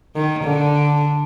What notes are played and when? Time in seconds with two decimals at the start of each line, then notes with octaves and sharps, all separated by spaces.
0.16 D#3
0.44 D3